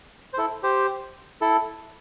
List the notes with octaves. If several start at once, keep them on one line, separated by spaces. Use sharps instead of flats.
C5
E4 A4
G4 C5
E4 A4